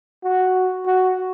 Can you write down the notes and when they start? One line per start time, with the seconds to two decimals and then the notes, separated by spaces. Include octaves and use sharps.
0.23 F#4
0.86 F#4